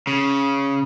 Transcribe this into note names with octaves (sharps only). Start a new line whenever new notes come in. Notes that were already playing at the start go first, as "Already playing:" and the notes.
C#3